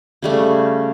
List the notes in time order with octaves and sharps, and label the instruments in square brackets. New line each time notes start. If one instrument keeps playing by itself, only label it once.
[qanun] C#3 G3 A3